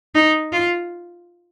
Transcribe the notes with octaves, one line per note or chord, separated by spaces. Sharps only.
D#4
F4